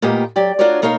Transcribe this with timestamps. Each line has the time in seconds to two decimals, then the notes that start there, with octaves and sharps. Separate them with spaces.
0.02 A#2 A#3 B3 G4 D#5
0.36 F#3 G4 D5 G5
0.59 D4 F4 F#4 A#4 C#5 D5
0.82 B2 A#3 D#4 A#4 C#5 F5